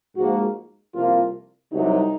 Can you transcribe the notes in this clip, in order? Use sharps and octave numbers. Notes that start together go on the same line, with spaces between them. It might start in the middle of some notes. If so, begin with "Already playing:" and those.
G#2 F3 A#3 F#4
C2 C3 F3 A#3 F4
C2 C3 F#3 D#4